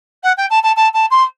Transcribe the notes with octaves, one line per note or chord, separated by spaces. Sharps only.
F#5
G5
A5
A5
A5
A5
C6